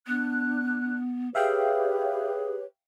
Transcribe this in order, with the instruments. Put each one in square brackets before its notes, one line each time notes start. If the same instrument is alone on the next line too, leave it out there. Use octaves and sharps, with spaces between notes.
[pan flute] B3 [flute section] D4 F#6
[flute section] G4 B4 C#5 [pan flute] G#4 [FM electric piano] E5 F5 G5